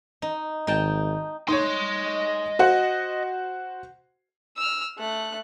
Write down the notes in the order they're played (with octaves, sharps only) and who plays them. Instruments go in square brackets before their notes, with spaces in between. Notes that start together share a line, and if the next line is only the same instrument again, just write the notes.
[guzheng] D#4
[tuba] G#1 [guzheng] D#4 G5 A5
[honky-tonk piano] D#4 C#5 [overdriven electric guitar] D#5 C6
[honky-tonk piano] F#4 C5 F#5
[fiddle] E6 F6
A3 F#6